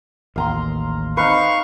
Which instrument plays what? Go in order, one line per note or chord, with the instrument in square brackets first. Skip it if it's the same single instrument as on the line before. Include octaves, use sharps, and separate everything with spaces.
[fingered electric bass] A1 D#2 [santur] F5 A#5 C6
[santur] C4 D#4 B4 [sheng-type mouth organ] F5 C#6